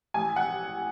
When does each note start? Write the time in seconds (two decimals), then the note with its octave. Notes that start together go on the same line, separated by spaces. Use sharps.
0.14 A1 G#5
0.36 F#5